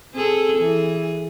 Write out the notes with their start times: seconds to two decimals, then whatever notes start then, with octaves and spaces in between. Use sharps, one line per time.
0.14 C4 G#4 A4
0.58 E3 G#4